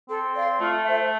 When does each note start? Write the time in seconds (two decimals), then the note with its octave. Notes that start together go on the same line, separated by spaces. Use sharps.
0.09 C4 A4
0.34 D5 F5 C6
0.60 A3 F4
0.85 A4 C5 E5